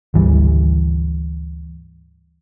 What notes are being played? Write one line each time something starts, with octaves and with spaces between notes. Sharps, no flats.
G#1 D2 E3 G3